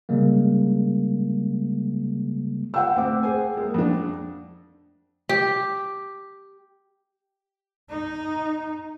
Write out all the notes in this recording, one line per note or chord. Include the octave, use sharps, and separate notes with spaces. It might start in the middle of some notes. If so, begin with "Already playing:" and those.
C#3 G3 G#3 A#3
F4 F#5 G5 E6
D2 C4 D6
G#4 C5 G#5
G#3 A#3
F2 D4
G4
D#4